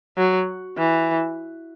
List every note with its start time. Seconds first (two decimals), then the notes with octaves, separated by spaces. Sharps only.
0.18 F#3
0.78 E3